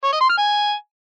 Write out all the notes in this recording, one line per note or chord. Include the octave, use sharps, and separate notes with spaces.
C#5
D#5
C6
F6
G#5